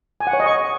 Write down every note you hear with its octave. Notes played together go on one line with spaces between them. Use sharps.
G#5
F#5
C#5
D#5
C#6